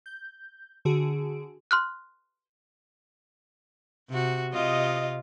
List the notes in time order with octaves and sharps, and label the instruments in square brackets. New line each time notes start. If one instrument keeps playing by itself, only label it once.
[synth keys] G6
D3 F#4 G#4 D7
[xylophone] C6 F6 F#6
[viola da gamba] C3 F#4
[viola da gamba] C3 F4 [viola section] D#5